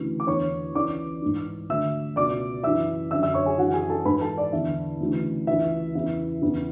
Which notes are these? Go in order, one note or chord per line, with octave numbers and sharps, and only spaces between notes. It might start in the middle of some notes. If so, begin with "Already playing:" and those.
Already playing: D2 C#3 E3
D6
E2 D3 C#5 C#6
C#2 C#3 E3 D5 D6
G#2 E3
D2 D3 E5 E6
C#2 B2 D5 D6
F#2 C#3 E3 E5 E6
F#2 D3 E5 E6
E5 E6
C#5 C#6
G#4 G#5
F#2 C#3 E3 F#4 F#5
G#4 G#5
A4 A5
G#2 E3 B4 B5
A4 A5
D5
E2 D3 E5
D2 C#3 E3
C#2 C#3 E3 E5
E2 C#3 E3 E5
E2 C#3 E3